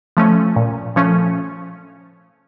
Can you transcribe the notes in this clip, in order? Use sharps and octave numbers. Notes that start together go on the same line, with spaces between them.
F3 A3 C#4
A#2
F3 A3 C#4